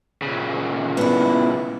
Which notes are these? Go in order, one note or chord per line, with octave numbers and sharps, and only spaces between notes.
A#2 C#3
B3 D4 E4